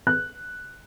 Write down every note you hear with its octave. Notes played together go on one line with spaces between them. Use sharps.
F#6